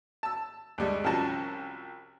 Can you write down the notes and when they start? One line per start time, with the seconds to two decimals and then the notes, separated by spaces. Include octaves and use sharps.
0.23 A5 E6
0.78 D2 G3 G#3
1.04 C2 F3 C#4 F#4 A5 A#5